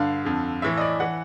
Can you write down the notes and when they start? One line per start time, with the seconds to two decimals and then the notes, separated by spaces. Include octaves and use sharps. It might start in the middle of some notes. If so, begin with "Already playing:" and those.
Already playing: G2 D3 F5
0.25 F2 D3
0.62 A2 E3 E5
0.77 D#5
0.81 D5
1.00 E3 F#5